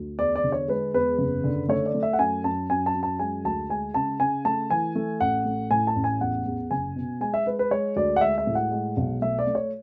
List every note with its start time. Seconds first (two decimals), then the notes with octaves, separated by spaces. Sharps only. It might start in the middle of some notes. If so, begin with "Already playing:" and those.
Already playing: D2
0.19 E2 D5
0.36 D5
0.44 D3
0.52 C#5
0.68 G#3 B4
0.94 E2 B4
1.19 F#1
1.44 D3
1.69 A3 C#5
1.86 D5
1.94 A3
2.03 E5
2.13 F#5
2.19 F#2 G#5
2.44 F#2 A5
2.70 F#2 G#5
2.86 A5
2.94 F#2
3.03 A5
3.19 G#3 G#5
3.45 D2 A5
3.69 G#3 G#5
3.94 C#3 A5
4.20 C#3 G#5
4.45 A3 A5
4.70 E3 G#5
4.95 A3
5.21 A1 F#5
5.45 A3
5.71 A2 G#5
5.87 A5
5.96 A1
6.04 G#5
6.21 E2 F#5
6.46 E2
6.71 F#1 G#5
6.96 B2
7.21 G#3 G#5
7.34 E5
7.46 G#3 B4
7.59 B4
7.71 G#3 C#5
7.96 D2 D5
8.16 F#5
8.21 G#3 E5
8.38 E5
8.47 A2
8.55 F#5
8.71 G#3
8.97 B1
9.22 A3 E5
9.39 D5
9.47 A3
9.55 C#5